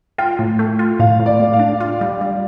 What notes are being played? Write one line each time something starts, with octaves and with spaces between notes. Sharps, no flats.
F4 G5
A2
A3
F4
A2 F5
A2
D5
A2
F5
D4
F4
G3
G3